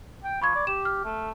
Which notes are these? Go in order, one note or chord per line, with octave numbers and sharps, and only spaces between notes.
G5
F3 B5 C#6 G#6
D5
G4 E7
F6
A3